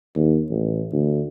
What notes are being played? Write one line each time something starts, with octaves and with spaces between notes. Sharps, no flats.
D#2
A1
D2